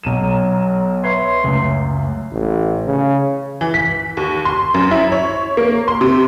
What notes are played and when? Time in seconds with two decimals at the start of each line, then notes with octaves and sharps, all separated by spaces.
0.03 B1 F#3 D#7 E7
1.04 B4 C#5 E5 C6
1.44 C#2 F#2 A3
2.31 A1
2.86 C#3
3.61 E3
3.74 B6
4.17 D#2
4.45 C6
4.74 F#2
4.91 E4
5.12 C#5
5.57 A#3
5.88 C6
6.01 C3